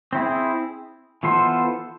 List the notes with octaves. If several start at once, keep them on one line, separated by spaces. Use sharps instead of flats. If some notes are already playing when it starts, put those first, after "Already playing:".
C4 E4 G#4
E3 B3 F4 A4 C5